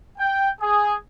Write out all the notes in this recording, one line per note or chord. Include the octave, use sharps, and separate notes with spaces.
G5
G#4